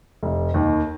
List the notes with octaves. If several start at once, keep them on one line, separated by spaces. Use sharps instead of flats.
F1
D#2 D#3